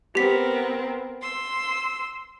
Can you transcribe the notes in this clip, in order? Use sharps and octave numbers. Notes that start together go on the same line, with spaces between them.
B3 C4 G4 A#4 B6
C6 E6